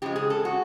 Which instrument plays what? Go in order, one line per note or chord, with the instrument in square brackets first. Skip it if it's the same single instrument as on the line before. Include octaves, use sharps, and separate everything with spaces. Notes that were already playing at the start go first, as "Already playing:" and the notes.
[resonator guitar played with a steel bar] C#3 F3 G#3 G4
G#4
A4
F#4